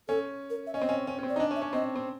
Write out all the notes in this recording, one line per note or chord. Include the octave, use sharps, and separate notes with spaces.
C#4 A4
A#4
E5
C#4 D#5
C4
C#4
C#4
C#4
C4
D5
D#4
D4 D#5
C#4
E5
C#4
C4 D#5
C4